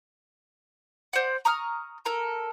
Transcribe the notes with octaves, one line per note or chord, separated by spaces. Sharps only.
C5 D5 F#5
A#5 C#6 D#6 F6
A4 A#4 A#5